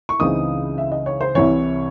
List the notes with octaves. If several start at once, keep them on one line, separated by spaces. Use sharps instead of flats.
C#6
C#2 C#3 E3 C4 D#4 D#6
E5
D#5
C#5
C5
C2 C3 E3 C#5